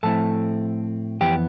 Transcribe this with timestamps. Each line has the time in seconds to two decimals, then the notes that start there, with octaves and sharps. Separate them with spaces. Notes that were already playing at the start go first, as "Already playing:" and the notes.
0.03 A2 F3 A3 C4 E4 A4 A5
1.21 F2 E3 B3 E4 G4 G5